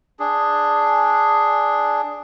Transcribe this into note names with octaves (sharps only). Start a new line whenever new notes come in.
D4 G#4